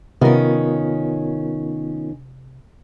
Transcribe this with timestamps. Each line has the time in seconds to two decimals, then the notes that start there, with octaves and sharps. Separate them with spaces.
0.21 C3 D#3 B3 C#4 F4 A#4